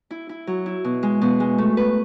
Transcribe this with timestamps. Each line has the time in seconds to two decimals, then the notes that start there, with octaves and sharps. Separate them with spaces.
0.10 E4
0.29 E4
0.47 F#3
0.66 E4
0.84 B2
1.03 G#3
1.21 B2
1.40 G#3
1.58 A3
1.77 B4